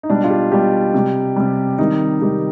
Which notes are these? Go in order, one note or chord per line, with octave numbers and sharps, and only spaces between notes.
D#4
B2 G3 D4
F4
G4
B2 G3 G4
C3 G3
C3 G3
C3 D#3 G3 D#4
C3 D#3 G3 G4